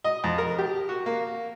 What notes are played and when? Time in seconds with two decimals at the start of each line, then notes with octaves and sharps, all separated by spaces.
0.04 D#5
0.24 F2
0.38 A#4
0.58 G4
0.89 F#4
1.06 A#3